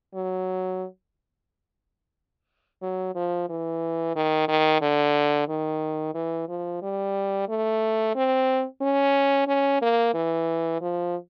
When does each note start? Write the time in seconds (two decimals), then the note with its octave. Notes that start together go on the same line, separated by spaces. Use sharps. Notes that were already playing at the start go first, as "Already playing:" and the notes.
0.15 F#3
2.82 F#3
3.15 F3
3.49 E3
4.15 D#3
4.48 D#3
4.81 D3
5.48 D#3
6.15 E3
6.48 F3
6.82 G3
7.49 A3
8.15 C4
8.81 C#4
9.47 C#4
9.81 A#3
10.14 E3
10.81 F3